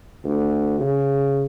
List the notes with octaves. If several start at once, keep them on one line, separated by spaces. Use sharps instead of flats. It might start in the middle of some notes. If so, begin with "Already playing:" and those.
D2
C#3